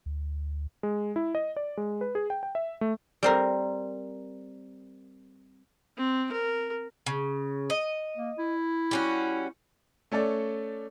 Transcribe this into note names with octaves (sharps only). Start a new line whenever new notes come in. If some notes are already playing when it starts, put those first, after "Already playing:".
D2
G#3
E4
D#5
D5
G#3
B4
G#4
G5
G5
E5
A3
G3 C4 A#4
C4
A#4
C#3
D#5
A#3
E4
G3 C#4 F#4
A3 C#4 A4 D5